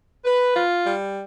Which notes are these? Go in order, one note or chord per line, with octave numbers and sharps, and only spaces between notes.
B4
F4
G3